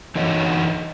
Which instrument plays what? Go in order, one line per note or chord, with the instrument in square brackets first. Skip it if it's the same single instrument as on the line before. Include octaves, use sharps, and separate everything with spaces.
[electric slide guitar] E3 D#4 F#4 C#5 D#5